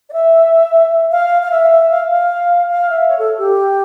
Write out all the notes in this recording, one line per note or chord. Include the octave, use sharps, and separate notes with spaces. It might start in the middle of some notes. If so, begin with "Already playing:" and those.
D5
E5
F5
F5
E5
E5
F5
F5
F5
E5
C#5
A4
G4